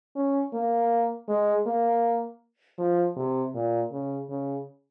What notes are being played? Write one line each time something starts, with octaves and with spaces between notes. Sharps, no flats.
C#4
A#3
G#3
A#3
F3
C3
A#2
C#3
C#3